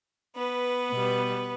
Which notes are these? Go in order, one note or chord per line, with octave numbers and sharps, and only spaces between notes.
B3 B4
B2 G3